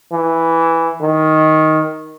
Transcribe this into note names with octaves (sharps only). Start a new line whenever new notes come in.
E3
D#3